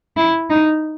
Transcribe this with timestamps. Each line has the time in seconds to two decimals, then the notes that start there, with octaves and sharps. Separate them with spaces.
0.17 E4
0.50 D#4